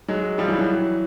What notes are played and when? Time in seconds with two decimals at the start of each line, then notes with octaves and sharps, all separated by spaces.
0.08 F#3 G#3
0.38 F3 G3
0.48 E3 F#3
0.59 E3 F#3